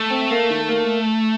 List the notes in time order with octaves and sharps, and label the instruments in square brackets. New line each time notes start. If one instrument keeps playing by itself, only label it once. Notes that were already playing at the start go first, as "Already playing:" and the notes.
Already playing: [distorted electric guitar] A3
[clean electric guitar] C4
A#3
D#3
A#3